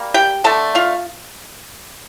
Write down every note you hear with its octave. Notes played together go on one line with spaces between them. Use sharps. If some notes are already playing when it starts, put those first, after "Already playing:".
Already playing: G3 A#3
G4 G5
D3 A3 A4 A5
F4 F5